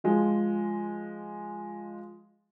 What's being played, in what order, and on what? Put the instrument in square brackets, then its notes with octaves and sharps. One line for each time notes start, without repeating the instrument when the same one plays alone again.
[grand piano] F3 G#3 F4